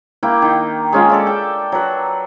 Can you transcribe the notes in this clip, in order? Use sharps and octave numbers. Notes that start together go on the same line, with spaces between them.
A#3 E4 G5
D#3
G#3 C#4 F4
A4 D5 E5
G5
F#3 B4